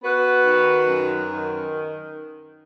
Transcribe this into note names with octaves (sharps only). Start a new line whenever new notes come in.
B3 F#4 B4
D#3
F#2
D#3